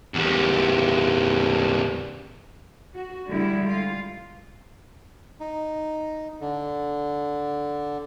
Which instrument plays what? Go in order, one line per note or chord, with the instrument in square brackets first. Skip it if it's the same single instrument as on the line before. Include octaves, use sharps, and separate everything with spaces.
[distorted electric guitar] E2 G3
[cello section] F#4
D3 G3 G#3 E4
F4
[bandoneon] D#4
D3